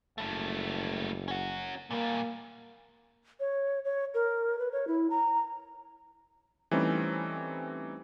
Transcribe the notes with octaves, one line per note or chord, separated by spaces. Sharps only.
F#1 G3 A3
C#4 F#4
A#2 G3 A#3
C#5
C#5
A#4
B4
C#5
E4
A#5
E3 G3 A3 C4 C#4 D#4